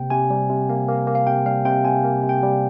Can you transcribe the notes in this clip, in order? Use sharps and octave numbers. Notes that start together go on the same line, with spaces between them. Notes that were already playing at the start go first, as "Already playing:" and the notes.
Already playing: C3 A#3 G5
C3 G#5
G3
C3
A#3
A#3
A#3
F5
C3 G5
G3 F5
C3 G5
C3 G#5
A#3
C3
G5
G3